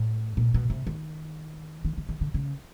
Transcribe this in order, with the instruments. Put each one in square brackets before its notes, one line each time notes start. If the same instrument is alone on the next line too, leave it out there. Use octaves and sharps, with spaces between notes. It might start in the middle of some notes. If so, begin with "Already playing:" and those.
Already playing: [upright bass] A2
A#2
B2
C3
D#3
D#3
D3
D#3
D3
C#3